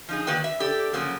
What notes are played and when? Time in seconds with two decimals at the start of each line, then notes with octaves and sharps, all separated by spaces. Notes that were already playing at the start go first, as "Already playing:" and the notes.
0.09 F3 D#4 G#4
0.27 D#3 A#3 F#4 B4 D5 G5
0.44 E5
0.60 G4 A4 D5
0.93 C#3 F3 F#3 A#3